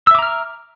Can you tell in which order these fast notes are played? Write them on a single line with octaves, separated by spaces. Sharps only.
E6 E5 D6 A#5 F6